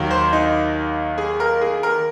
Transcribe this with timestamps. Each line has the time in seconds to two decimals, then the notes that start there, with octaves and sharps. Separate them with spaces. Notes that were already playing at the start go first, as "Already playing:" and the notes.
Already playing: D#2 D#3 F#3
0.11 C5
0.33 D#4
1.18 G#4
1.40 A#4
1.61 G#4
1.83 A#4